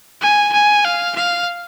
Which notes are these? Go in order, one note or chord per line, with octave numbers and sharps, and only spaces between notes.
G#5
G#5
F5
F5